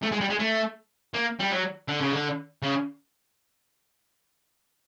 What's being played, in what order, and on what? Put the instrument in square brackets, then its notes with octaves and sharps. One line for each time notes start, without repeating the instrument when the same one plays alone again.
[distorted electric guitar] A3
G#3
G3
G#3
A3
A#3
G3
F#3
D3
C#3
D3
C#3